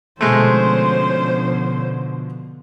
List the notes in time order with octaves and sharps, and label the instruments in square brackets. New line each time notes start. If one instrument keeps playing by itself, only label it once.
[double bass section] B2 D3 F3 [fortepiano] G#3 A3 [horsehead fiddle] C#4 C5